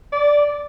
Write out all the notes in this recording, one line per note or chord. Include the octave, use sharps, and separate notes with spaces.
D5